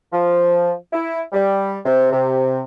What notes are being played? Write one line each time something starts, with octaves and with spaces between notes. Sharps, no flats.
F3
E4
G3
C3
C3